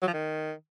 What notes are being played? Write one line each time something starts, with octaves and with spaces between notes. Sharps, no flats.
F#3
F3
D#3